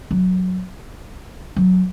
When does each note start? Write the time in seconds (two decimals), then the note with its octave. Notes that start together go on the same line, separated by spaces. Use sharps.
0.11 F#3
1.56 F#3